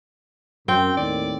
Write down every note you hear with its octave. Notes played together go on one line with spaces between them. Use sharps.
F#2 C4 G5
D#2 A2 D#3 D5